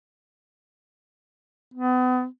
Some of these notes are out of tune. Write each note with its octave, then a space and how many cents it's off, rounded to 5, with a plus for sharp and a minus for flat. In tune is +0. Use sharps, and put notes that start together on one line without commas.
B3 +35